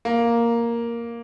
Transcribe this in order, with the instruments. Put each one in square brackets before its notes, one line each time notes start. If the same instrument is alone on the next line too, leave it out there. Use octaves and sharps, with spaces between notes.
[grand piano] A#3